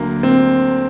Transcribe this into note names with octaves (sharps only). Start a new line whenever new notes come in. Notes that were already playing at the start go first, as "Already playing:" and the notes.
Already playing: D2 D3 F#3 A#3
C4